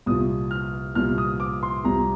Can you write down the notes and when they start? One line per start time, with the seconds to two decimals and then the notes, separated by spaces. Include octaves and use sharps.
0.06 C2 A#2 F3 D#6
0.51 F6
0.95 C2 A#2 F3 F6
1.18 D#6
1.40 D6
1.63 C6
1.84 C2 C3 F3 A#5